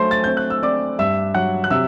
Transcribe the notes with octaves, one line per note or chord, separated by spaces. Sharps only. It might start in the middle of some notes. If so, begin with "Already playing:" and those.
Already playing: F#3 A3 C5 C6
A6
C4 G6
F#6
E6
C4 D5 D6
G2 E5 E6
F#3 F#5 F#6
F#6
C3 E5 E6